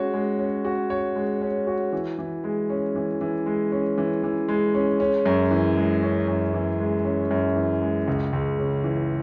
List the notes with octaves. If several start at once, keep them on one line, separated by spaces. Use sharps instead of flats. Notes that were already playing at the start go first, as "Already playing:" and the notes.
Already playing: G#3 C#4 F#4 C#5
G#3
C#4
F#4
C#5
G#3
C#4
F#4
E3
E3
G#3
C#4
E3
E3
G#3
C#4
E3
E3
G#3
C#4
C#4
F#2
E3
G#3
C#4
F#2
E3
G#3
C#4
F#2
E3
G#3
C#2
C#2
C#3
E3